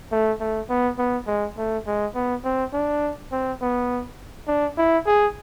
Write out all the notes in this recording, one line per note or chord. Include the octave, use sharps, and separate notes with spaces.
A3
A3
B3
B3
G#3
A3
G#3
B3
C4
D4
C4
B3
D4
E4
G#4